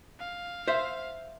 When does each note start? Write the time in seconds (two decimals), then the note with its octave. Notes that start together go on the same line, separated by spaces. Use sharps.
0.20 F5
0.68 C5 E5